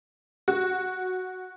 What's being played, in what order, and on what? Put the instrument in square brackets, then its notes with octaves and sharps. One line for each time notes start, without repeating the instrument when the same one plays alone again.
[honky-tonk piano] F#4